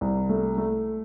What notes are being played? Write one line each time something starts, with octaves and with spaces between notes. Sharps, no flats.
C2
A3
A3